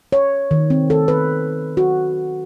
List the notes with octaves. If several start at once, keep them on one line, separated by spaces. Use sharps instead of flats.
C#5
D#3
C4
A4
B4
F#4